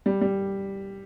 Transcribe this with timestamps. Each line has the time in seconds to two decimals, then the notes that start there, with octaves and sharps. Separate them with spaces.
0.06 G3
0.21 G3